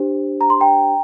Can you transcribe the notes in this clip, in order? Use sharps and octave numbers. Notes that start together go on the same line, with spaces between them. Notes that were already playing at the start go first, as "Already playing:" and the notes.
Already playing: D4 G4 C5
A#5
C6
G5 A#5